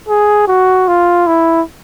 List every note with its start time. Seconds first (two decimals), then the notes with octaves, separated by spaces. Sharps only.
0.08 G#4
0.47 F#4
0.88 F4
1.27 E4